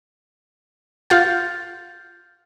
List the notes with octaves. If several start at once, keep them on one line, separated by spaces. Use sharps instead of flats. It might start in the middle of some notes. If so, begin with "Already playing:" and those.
F4 F5 F#5 F6 G6 A6